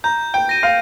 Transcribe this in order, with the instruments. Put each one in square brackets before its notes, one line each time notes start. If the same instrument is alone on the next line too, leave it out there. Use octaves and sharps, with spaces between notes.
[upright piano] A#5 [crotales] G6
[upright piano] G5
[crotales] A#6 D#7
[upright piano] F5